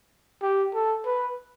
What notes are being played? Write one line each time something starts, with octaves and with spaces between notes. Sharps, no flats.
G4
A4
B4